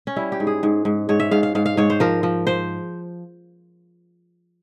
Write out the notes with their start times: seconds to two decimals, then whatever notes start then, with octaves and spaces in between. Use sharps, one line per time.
0.07 C#4
0.16 G3 E4
0.32 G4
0.40 G#2
0.47 G#4
0.63 G#2
0.85 G#2
1.09 G#2 C#5
1.20 E5
1.31 G#2 F5
1.43 F5
1.55 G#2 F5
1.66 F5
1.77 G#2 C#5
1.90 C5
2.00 F3 A#4
2.23 F3
2.47 F3 C5